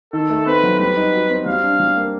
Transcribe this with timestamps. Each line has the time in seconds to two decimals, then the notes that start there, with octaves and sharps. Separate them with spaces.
0.13 D#3 A4
0.30 A3
0.46 C4 B4
0.63 F#3
0.79 G3 B4
0.97 D#4
1.13 F#4
1.30 C4
1.46 G3 F5
1.64 D4
1.80 G3
1.96 A#3